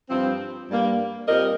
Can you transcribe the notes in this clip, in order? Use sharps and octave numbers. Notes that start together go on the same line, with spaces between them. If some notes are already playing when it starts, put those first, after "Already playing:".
G2 F3 C4
G2 G3 A#3
A#2 G3 C4 A#4 D#5